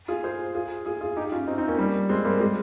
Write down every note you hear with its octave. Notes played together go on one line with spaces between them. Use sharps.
F4 G#4
G#4 C5
F4 G#4
F4 G#4
F4 G#4
D#4 G4
C#4 F4
C4 D#4
C4 D#4
A#3 C#4
G3 A#3
G#3 C4
G3 A#3
G#3